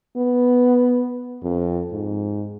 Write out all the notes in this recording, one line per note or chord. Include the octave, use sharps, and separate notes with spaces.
B3
F2
G#2